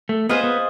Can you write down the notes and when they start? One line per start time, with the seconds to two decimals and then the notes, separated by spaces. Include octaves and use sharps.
0.09 A3
0.29 B3 F4 G#4 C5 D#5
0.44 B3